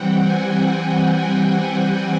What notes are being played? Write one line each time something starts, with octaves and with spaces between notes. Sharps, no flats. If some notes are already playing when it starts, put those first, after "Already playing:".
Already playing: E3 G3 C4 F#5 G5
G#5